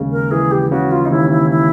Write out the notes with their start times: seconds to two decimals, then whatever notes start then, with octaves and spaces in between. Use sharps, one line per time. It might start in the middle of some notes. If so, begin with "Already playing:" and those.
Already playing: D#2 C#3 G#3
0.12 A#4
0.31 E3 G#4
0.51 G4
0.71 C#3 F#4
0.91 F4
1.05 D#4
1.11 D#2 E4
1.30 E4
1.50 E4